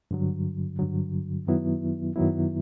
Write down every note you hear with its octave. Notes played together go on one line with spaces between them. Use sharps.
G2 D3 F#3
G2 D3 F#3
F#2 D#3 F#3 B3 E4
F#2 D#3 F#3 B3 E4